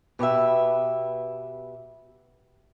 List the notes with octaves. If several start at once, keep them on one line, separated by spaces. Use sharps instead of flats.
B2 G4 B4 E5